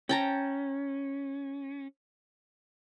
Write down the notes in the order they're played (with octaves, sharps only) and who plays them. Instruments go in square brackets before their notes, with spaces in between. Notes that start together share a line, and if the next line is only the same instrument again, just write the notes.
[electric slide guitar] C#4 [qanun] G5 A5 A#5